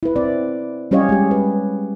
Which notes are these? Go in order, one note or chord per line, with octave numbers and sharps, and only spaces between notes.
E4 B4
C4 D5
G3 C#4 G4 C#5 D#5 F5
G#3 G4
B4